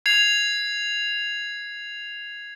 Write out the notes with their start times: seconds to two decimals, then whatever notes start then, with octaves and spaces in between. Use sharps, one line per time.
0.06 G#6 C7 F7